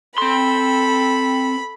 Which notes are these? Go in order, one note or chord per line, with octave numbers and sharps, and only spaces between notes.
C4 A4 B5 C6